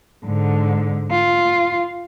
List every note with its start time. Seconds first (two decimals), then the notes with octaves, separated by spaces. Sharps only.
0.25 G#2 D3
1.11 F4